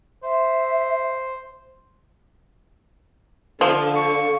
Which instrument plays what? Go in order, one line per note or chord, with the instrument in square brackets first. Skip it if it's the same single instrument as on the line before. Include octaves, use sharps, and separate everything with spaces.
[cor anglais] C5 [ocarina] E5
[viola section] D3 [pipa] F3 [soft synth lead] F5
[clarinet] C#6